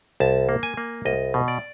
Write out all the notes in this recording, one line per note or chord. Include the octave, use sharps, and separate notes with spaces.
C2 A5
A#3
G#5
A#3
C2 D#5
B2
D5